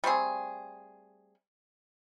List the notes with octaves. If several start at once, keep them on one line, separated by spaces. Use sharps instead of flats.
G3 A3 C4 G#4